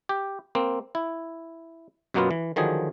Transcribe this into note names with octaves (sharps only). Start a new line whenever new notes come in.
G4
A#3 C4
E4
F#2 B2 F#3 A#3 B3 F4
E3
D3 D#3 F3 F#3 G#4